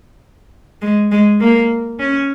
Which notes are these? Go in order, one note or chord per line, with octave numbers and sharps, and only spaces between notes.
G#3
G#3
A#3
C#4